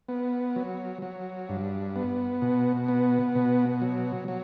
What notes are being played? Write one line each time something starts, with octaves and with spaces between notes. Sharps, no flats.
B3
F#3
F#3
G2
B3
B2
B3
B2
F#3
F#3